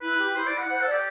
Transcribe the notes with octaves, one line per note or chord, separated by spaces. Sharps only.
E4 B4
G4
E4 C5
D5
E4
F#5
C5 F#5
A4
D5
G4